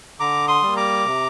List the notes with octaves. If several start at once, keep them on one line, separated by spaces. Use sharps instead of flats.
D3 A#5 D6
C6 D#6
G3 A#3
A#5 D6
C3